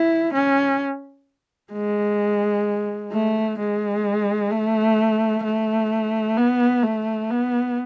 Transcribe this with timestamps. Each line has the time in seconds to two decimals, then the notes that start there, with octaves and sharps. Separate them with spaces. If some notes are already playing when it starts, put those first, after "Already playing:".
Already playing: E4
0.33 C#4
1.72 G#3
3.12 A3
3.59 G#3
4.51 A3
5.44 A3
6.38 B3
6.83 A3
7.30 B3